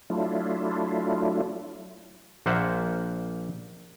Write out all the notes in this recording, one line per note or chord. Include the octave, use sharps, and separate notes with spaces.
F#3 A3 D4 E4 F4
A#1 A#3 C5 E5 F#5